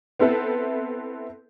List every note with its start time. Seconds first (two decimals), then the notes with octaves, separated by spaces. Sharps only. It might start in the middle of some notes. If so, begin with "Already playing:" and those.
0.19 B3 C4 E4 A4 B4 C5